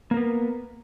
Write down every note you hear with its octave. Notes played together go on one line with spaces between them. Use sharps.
A#3 B3 A#4